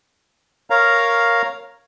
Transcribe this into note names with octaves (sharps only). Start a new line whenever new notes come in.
A#4 C#5 F5 A#5